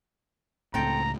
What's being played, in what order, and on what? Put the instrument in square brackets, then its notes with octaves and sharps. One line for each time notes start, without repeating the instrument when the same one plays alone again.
[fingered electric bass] C#2 A2 [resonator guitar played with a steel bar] C4 A4 G5 [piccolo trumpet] A#5